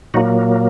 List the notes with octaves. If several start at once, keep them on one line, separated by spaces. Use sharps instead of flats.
A#2 F#3 A#3 D#4 F#4